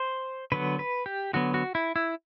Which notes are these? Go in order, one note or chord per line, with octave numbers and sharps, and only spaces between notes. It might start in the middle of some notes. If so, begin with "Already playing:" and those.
Already playing: C5
D3 F#3 B3 B4
B4
G4
D3 F#3 B3 F#4
F#4
E4
E4